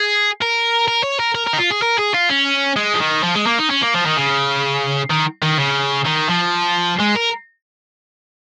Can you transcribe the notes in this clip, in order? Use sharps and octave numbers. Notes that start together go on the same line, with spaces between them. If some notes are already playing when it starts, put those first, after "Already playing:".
Already playing: G#4
A#4
A#4
C#5
A#4
A#4
A#4
D#4
F4
G#4
A#4
G#4
F4
C#4
G#3
F3
D#3
F3
G#3
A#3
D#4
C#4
A#3
F3
D#3
C#3
D#3
D#3
C#3
D#3
F3
G#3
A#4